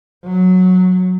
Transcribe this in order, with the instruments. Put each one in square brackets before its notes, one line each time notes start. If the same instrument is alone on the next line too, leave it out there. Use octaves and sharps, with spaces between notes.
[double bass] F#3